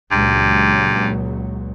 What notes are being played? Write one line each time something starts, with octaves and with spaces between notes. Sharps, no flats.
C#2 G2 A#2 F#3